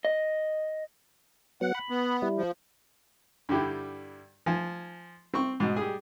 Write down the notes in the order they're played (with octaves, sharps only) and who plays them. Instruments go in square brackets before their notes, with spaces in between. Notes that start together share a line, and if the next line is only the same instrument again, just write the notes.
[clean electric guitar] D#5
[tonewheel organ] F#3 B3 [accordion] F#5
[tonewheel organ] B5
[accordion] B3
[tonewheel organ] G3 E4
[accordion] F3
[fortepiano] G2 D3 G3 E4
F3 G#5
C4 C#6
G#2 B2
G3 G#4